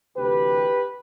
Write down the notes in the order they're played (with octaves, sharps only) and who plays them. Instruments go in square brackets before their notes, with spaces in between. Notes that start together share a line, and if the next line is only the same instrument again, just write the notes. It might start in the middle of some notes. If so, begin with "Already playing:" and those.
[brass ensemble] D2 C3 E3 G4 B4